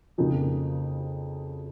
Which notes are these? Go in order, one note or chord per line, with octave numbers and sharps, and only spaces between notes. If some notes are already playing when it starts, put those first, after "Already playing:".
F2 C#3 F3 A#3 D#4